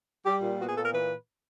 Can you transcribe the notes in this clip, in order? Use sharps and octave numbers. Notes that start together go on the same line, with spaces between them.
G3 G4
A#2
B3 F#4
G#4
A#2 A4
A#4
E3 B4